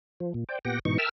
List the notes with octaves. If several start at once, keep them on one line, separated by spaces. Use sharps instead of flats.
F3
A#2
C5 D5 G5
A#2 B3 G4 F#5 G5 A#6
G#2 B2 E3 D#4 C#6
A#4 E5 G5 A5 E6 F6